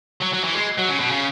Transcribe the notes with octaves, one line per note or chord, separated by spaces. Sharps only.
F#3
F#3
E3
G#3
F#3
C#3
B2
C#3